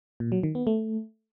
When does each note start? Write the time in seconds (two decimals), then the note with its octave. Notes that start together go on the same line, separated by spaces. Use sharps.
0.20 A#2
0.32 F#3
0.43 D#3
0.55 B3
0.67 A3